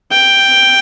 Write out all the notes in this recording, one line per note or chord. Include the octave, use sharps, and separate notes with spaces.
G5